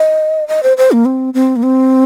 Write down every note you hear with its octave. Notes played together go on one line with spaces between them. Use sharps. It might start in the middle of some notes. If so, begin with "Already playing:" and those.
Already playing: D#5
D#5
C5
C5
A#3
C4
C4
A#3
C4